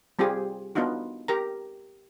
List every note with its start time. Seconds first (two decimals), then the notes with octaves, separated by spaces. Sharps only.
0.19 G3 C4 F4 G4 G#4
0.75 B3 D4 D#4 F4 F#4
1.28 G4 A#4 A#5